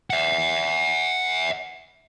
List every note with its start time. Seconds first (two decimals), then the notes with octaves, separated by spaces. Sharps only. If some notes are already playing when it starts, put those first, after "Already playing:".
0.10 E5 F#5